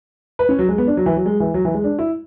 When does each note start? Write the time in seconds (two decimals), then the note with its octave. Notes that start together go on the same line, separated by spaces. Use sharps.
0.39 B4
0.49 C#4
0.59 F#3
0.69 G#3
0.78 B3
0.87 D4
0.97 F#3
1.06 E3
1.17 F#3
1.26 G#3
1.40 E3
1.54 F#3
1.65 E3
1.74 G#3
1.84 D4
1.99 E4